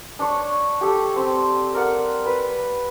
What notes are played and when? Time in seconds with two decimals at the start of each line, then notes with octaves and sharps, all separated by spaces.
0.19 D4 C#5
0.81 G4 A4
1.16 C4
1.74 A#4 D5 F#5
2.26 B4